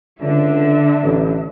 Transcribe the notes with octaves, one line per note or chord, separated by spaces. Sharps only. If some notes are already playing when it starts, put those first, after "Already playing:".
C#2 D3 D4 E5
A1